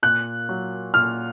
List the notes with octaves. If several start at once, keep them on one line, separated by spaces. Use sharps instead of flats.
A#2 F#6
F#3
A#2 F6